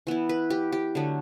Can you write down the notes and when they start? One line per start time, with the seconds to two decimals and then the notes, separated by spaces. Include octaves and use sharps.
0.07 E3 B3 E4
0.29 B4
0.50 G4
0.72 G4
0.95 D3 F#3 A3